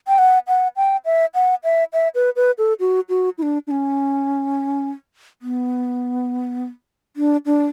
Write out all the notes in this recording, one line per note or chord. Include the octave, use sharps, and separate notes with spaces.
G5
F#5
F#5
G5
E5
F#5
E5
E5
B4
B4
A4
F#4
F#4
E4
D4
D4
C#4
B3
D4
D4